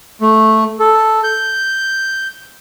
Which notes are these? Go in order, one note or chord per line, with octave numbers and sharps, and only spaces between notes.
A3
A4
G6